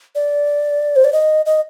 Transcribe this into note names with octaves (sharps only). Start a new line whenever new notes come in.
D5
C5
D5
D#5
D#5